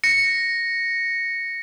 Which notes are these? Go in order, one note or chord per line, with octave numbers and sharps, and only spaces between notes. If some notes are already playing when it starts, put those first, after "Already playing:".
A#6 C#7